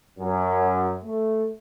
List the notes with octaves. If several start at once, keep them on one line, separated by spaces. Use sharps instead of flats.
F#2
A3